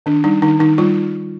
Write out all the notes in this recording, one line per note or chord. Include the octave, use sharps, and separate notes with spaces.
D#3 D4
G3 D#4
D#3 D#4
D#3 D#4
G3 F4